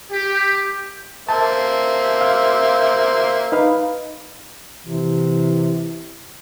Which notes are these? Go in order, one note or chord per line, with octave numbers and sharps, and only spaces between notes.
G4
A#3 C5 E5 A5
F5
D#4 B4 F5
C3 E3